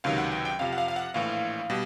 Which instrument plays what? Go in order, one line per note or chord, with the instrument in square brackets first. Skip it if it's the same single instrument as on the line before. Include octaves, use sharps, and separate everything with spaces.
[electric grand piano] C#2 C3 D#3 F#3 F5
F#5
G5
G5
F2 C3 F3 F5
F#5
F5
F5
F#5
A#1 A2 E3 F5
B2 G3